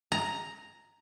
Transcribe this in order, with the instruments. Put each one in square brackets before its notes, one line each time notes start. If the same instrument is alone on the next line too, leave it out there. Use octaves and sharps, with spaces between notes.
[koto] A#5